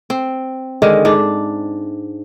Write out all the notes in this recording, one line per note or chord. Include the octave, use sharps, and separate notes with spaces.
C4
D3 D#3 G#3
G#2 D4